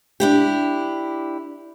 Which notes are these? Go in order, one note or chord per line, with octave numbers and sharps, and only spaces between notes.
D4 E4 G4